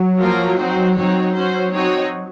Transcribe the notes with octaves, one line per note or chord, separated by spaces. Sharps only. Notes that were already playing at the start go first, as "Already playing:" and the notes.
Already playing: F#3
F3 A#3 F4 A#4
C4 D#4 F#4 C5
F#3 C4 D#4 F#4 C#5
C#4 F#4 C5
C4 D#4 F#4 C#5